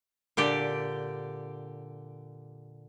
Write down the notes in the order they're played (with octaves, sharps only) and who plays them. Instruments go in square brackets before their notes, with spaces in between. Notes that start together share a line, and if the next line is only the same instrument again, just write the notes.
[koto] A#2 D3 G4 D5